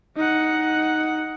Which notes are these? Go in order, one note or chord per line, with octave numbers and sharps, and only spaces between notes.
D#4 F#5